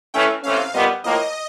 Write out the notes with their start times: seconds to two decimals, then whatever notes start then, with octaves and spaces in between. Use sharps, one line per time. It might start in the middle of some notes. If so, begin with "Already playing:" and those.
0.14 E3 A3 C#4 G5
0.43 C3 E3 A3 C#4 F5
0.74 A#2 G3 B3 D#5
1.04 A2 F3 A#3 D#5